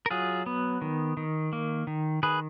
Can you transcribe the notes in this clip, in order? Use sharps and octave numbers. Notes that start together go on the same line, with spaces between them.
A#4
F#3 F4 G#4
B3
D#3
D#3
A#3
D#3
D#3 G#4 B4